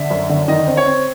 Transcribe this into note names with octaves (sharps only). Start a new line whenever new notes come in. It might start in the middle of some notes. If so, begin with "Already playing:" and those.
Already playing: D3 E5
F#2
D3
D#3 D#5
C4
C#5
C4